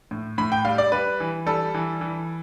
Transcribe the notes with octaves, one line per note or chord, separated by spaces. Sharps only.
A2
A2 B5
G5
G3 F5
D5
G3 B4
E3
G3 A4
E3
E3